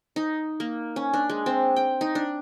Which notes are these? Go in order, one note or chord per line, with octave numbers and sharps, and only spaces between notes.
D#4
A#3
C#4
D4
G#3
C4
G5
D#4
D4